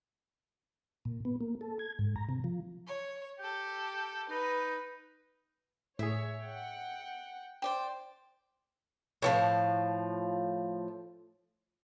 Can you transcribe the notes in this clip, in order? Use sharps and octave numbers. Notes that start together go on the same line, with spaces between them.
A#2
B3
A#3
A4
G#6
G#2
A#5
C3
F3
C#5
G4 A4 G5
D#4 B4
A2 G#4 C#5 E5
F#5 G5
C5 D5 G5
A2 E3 F3